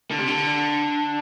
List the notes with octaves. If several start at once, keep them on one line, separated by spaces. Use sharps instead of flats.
D3
C3
D3